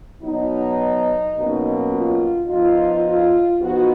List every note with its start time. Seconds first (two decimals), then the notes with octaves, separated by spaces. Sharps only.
0.23 B2 F#3 B3 D#4
1.36 B2 F#3 A#3 C#4
1.91 F4
2.47 F3 B3 D#4 F4
3.03 F4
3.59 F3 B3 D#4 F#4